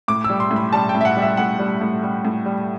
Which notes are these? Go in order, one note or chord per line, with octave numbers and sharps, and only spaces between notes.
A2 D6
E6
G3
C6
A2
B5
G3 A5
G5
A2
E5
F#5
G3
E5
A2 F#5
G3
A2
G3
A2
G3